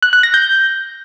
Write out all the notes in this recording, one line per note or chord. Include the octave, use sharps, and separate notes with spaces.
F#6
F#6
A#6
G6